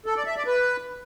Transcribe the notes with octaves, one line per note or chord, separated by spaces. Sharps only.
A4
D5
E5
D5
B4